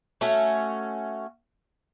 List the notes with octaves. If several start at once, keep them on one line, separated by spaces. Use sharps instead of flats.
A3 C#4 F#4